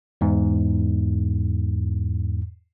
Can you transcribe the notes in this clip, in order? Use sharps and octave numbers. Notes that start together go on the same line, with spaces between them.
E2 G#2